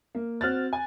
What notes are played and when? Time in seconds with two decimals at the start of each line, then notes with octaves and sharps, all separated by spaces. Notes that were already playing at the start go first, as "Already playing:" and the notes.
0.15 A#3
0.41 C4 F#4 F6 F#6 A6
0.73 G#5